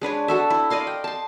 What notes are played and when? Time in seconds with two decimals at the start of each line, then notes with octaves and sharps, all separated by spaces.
0.01 G#3 D4 B4 C#5
0.28 F#4 A4 E5
0.50 E4
0.70 D5 D#5 F5 C6
0.87 G5
1.04 A5 C6